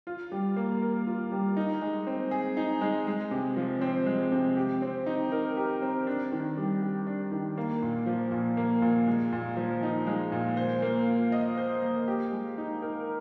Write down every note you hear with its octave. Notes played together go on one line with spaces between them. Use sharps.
F4
G3
A#3
A#4
F4
G3
D#4
G#3
C4
G#4
D#4
G#3
G#3
C3
F3
C4
G#3
C3
G4
C4
D#4
A#4
G4
C4
D4
D#3
G3
G4
D4
D#3
A#3
A#2
F3
A#2
A#3
A#2
G#3
A#2
F3
D#4
G#3
A#2
C5
A#3
F4
D#5
C5
A#3
G4
G#3
D#4
A#4